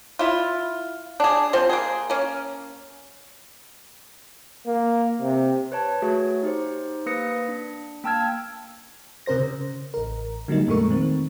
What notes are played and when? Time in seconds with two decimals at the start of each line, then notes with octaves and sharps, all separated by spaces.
0.19 E4 F4
1.20 D4 G#4
1.53 F3 C4 C5
1.69 A#3 G#4
2.10 A#3 C#4
4.67 A#3
5.22 C3
5.72 B4 C#5 A5
6.02 A3 F#4 G#4 C#5
6.43 D#4 G4 C5
7.06 A#3 B4 D#6 A#6 C#7
7.48 D4
8.04 A#3 G5 A5 E6 F6 G#6
9.26 C3 C#4 A#4 C5 A#6
9.38 C#3
9.94 A1 A#4
10.48 D3 F#3 G3 A#3 D#4
10.67 F2 A#2 G#3 A3 A#4 C#6
10.90 D#3 C4